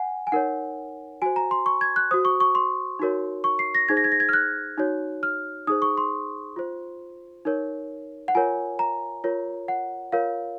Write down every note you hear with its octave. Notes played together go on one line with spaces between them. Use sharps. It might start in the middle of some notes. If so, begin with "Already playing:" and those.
Already playing: F#5 G#5
G#5
D#4 A#4 C#5 F#5
F#4 C5 G#5
A#5
C6
C#6
G#6
F#6
F#4 C5 D#6
C#6
C#6
C6
D#4 F#4 A#4 C#5
C#6
C7
A#6
D#4 G#4 C5 G#6
A#6
G#6
A#6
G#6
F6
F#6
D#4 F#4 C#5
F6
D#4 G#4 C5 D#6
C#6
C6
F4 C5
D#4 A#4 C#5
F#5
F4 A#4 C#5 G#5
A#5
F4 A#4 C#5
F#5
F4 A#4 C#5 F5